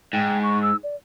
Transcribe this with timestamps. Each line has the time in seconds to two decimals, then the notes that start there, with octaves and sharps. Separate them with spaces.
0.13 G#2 G5
0.43 C#6
0.62 E6
0.83 D5